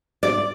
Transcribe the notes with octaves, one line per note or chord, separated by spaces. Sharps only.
D5